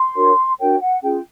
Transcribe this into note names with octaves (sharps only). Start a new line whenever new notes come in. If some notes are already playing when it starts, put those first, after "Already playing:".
Already playing: C6
D4 F#4 A#4 C#5
D4 F#4 A#4 C#5 G5
F#5
C#4 F4 G#4 G5